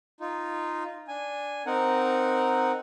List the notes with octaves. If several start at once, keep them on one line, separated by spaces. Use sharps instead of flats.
D#4 F4
D4 G#5
C4 D#4 A#4 F#5